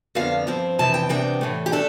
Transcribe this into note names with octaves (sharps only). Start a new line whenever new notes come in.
F2 D3 F3 B3 F5
G2 F3 C4
F2 C3 E3 A5
G5
E2 C3 G3 B3 D4 G5
A2 E3 A3
G4
A3 D4 A4